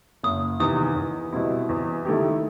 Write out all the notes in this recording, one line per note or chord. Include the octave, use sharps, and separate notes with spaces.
F#1 D#6
E2 C3 D#3 D#6
E2
B2 G3 C4 E4
E2
D#3 A3 E4 G4